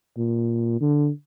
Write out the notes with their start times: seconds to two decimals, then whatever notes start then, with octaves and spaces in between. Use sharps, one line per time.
0.17 A#2
0.81 D3